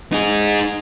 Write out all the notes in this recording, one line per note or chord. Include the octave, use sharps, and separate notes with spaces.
D#4 G#4